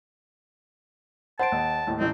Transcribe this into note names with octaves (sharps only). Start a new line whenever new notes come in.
C5 F#5 A5 C6 D7
D#2
D#2 A2
A1 E3 C4 D#5